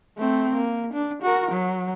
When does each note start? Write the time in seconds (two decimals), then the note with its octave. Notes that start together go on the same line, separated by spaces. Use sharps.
0.18 A3 C4
0.55 A#3
0.93 D4
1.23 F#4 A#4
1.52 F#3